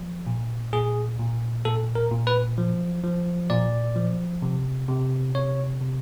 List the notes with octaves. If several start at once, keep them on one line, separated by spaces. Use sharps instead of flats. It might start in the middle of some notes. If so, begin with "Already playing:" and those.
Already playing: F3
A#2
A#2 G#4
A#2
A#2 A4
A#4
A#2
B4
F3
F3
A#2 D5
F3
C3
C3
C3 C#5
C3